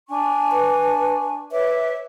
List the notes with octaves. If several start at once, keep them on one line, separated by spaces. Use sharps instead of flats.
D4 G#5 C#6
B4
B4 C#5 E5 D6